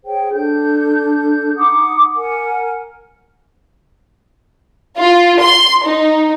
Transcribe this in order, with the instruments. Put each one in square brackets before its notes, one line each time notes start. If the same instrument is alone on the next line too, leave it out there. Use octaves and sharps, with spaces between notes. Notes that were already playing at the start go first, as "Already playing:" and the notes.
[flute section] G#4 C5 C#5 G5
D4 A4 G6
D#4 F#5 D6 D#6
A#4 F#5 G#5
[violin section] F4
C6
D#4